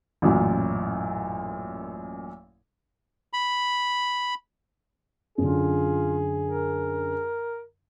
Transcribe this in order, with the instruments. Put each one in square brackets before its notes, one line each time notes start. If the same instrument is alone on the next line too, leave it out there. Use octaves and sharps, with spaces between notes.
[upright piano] A1 F#2 A#2
[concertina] B5
[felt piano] F#2 D3 [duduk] F4 [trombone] G#4
[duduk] A#4